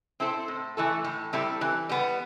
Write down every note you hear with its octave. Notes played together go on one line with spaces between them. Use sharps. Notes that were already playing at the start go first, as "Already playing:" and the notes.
C4 E4 A4 C5
A2
E3 A3 E4 A4
A2
G3 C4 E4 A4
E3
G3 B3